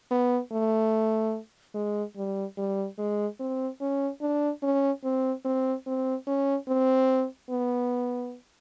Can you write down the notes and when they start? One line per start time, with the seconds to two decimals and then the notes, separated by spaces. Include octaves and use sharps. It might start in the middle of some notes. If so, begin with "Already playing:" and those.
0.11 B3
0.52 A3
1.75 G#3
2.16 G3
2.58 G3
2.98 G#3
3.40 C4
3.81 C#4
4.21 D4
4.63 C#4
5.04 C4
5.45 C4
5.86 C4
6.27 C#4
6.68 C4
7.50 B3